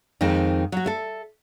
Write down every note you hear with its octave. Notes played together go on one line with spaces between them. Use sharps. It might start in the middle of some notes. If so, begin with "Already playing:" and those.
F2 D#3 G#3 C4 D#4
F#3 F#4
A4 E5